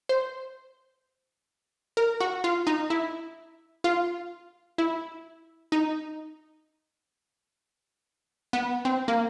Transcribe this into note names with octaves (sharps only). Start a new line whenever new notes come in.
C5
A#4
F#4
F4
D#4
E4
F4
E4
D#4
B3
C4
A#3